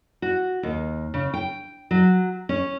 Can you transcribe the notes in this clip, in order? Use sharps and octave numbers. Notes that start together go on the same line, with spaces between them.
F#4
D#2
C#3
G5
F#3
C#4